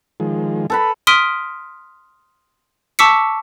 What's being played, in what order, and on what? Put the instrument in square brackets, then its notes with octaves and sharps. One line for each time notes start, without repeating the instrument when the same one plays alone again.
[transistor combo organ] D#3 F3 G#3
[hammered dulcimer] A4 B4 B5
[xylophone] C6 D#6 F6 B6 D7 D#7
A5 C#6 D6 E6 B6 C#7